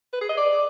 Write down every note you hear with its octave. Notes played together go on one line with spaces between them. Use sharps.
B4
G#4
D#5
D5